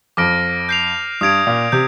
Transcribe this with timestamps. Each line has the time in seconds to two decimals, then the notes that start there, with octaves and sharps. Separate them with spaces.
0.17 F2 D6 F6 A#6 D7
0.69 G6 C7 F7
1.21 G2 D#6 G#6 D7
1.47 A#2
1.72 C3 G6